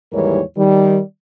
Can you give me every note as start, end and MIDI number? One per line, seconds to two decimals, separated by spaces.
0.13 0.40 39
0.13 0.40 44
0.13 0.40 52
0.13 0.40 55
0.13 0.40 70
0.13 0.40 73
0.57 1.00 51
0.57 1.00 55